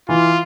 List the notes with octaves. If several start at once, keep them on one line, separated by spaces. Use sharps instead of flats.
E3 F4